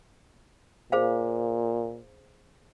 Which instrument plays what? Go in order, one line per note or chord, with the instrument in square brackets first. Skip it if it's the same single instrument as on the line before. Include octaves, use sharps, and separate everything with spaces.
[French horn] A#2 [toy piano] G#4 C5 F5